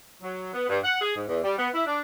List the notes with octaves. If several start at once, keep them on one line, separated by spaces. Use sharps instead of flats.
F#3
B3
G2
F#5
G#4
G#2
E2
G3
B3
E4
D4